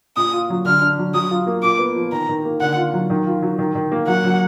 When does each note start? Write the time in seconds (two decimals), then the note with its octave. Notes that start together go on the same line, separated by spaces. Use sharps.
0.17 A#2 D#6
0.33 F4
0.50 F#3
0.65 D3 F6
0.81 D4
0.98 F#3
1.14 F#3 D#6
1.31 F4
1.47 A#3
1.63 A#2 D6
1.79 B3
1.96 F3
2.12 D#3 A#5
2.29 D#3
2.45 A#3
2.61 D3 F#5
2.77 F4
2.94 F#3
3.10 D#3
3.26 F4
3.42 F#3
3.58 D#3
3.75 D#3
3.92 A#3
4.08 F#3 F#5
4.24 F#3